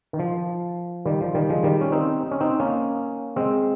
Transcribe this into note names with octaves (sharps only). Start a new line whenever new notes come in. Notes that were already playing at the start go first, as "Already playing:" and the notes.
D#3
F3
D#3 G3
F3
D#3 G3
F3 G#3
D#3 G3
C#4
C4 D#4
C#4
C4 D#4
A#3 C#4
G#3 C4